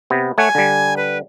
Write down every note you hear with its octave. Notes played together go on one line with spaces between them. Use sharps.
C3 B3
A3 C#5 F#5 G#5
D3 G3
B4